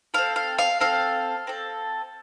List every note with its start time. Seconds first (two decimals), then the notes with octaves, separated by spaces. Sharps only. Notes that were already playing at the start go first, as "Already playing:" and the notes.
0.14 C4 A4 F5
0.36 F5
0.59 F5
0.80 C4 A4 F5
1.47 C4 A4